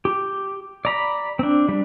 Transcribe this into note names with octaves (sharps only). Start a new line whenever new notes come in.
G4
D5 A#5 B5
C4 D4
G3 D4